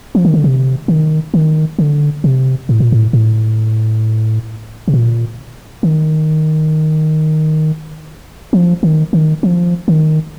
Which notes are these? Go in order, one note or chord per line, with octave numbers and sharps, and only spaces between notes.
F3
D#3
D3
C3
D#3
D#3
D3
C3
A2
A#2
A2
A2
C3
A#2
D#3
F3
D#3
D#3
F3
D#3